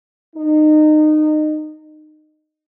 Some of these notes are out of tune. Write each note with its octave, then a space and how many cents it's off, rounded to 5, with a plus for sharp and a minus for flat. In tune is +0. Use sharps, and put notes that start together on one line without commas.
D#4 -25